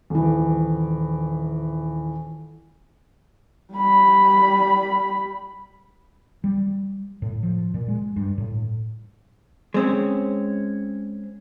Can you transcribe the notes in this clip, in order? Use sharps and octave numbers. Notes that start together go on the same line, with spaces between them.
D#1 E3
G3 B5
G3
A2
F3
A#2
G#3
G2
A2
G#3 C4 C#4